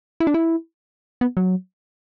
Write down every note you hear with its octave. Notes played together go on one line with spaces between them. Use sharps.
E4
D4
E4
B3
F#3